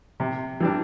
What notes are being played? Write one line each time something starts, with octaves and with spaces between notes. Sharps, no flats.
C3
E3 G3 D4